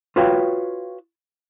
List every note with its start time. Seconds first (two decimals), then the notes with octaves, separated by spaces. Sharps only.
0.16 F4 F#4 B4 C#5 F5 G5